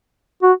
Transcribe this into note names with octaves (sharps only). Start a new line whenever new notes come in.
F#4